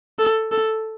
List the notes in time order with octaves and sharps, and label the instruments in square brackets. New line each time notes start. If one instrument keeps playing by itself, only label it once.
[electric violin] A4
A4